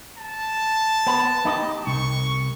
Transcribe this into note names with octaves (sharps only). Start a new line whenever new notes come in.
A5
B3
D#4 G4 D#5
C2 C#6